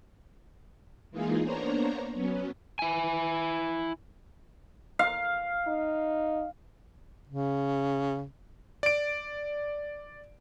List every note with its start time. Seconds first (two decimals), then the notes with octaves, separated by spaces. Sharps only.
1.11 E3 G#3 A#3 D#4 F4 G#4
1.43 A#3 B3 D4 C5 C#5 A#5
2.14 F#3 B3 C#4
2.79 E4 G#5
4.99 F5
5.67 D#4
7.27 C#3
8.83 D5 D7